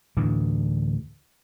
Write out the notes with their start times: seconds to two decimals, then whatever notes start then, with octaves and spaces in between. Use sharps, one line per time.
0.17 D2 A2 E3